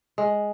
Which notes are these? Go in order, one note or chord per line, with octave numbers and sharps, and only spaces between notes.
G#3